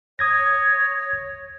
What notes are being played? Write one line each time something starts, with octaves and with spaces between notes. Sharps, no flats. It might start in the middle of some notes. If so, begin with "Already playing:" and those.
C#5 D#6 G#6 A#6